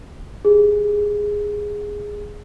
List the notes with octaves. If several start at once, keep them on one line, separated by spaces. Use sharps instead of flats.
G4 G#4